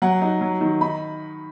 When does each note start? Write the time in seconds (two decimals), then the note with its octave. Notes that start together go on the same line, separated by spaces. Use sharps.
0.02 F#3 F#5
0.21 D#4
0.41 F#3
0.61 D#3
0.81 D#4 B5